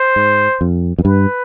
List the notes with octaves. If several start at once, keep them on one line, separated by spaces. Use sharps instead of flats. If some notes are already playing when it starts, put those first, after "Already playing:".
Already playing: C5
G#2
F2
F2
G2 B4